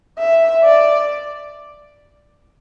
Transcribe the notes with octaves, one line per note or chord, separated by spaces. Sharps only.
E5
D5